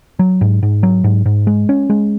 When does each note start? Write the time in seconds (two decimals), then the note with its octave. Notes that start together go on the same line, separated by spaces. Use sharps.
0.19 F#3
0.41 G#2
0.63 G#2
0.83 F#3
1.04 G#2
1.26 G#2
1.47 G#3
1.69 C#4
1.90 G#3